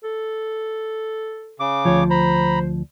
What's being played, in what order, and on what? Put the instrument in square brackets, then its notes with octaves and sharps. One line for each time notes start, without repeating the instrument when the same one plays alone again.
[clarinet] A4
[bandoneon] C#3 D6
[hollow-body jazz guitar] D2 F3 [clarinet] C#5
[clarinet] C5 [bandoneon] A#5 B5